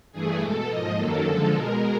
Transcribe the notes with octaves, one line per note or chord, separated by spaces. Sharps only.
G2 E3 A3 G#4
E2 B2 G#3 A4
G#2 F3 A#3 D#5
F#2 D#3 F#3 A#3 A4
F#2 D3 F3 G#3 A4
B2 G#3 A#4